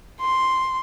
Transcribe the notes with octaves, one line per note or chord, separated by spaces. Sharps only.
C6